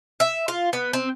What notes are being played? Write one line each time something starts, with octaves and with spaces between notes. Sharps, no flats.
E5
F4
B3
C4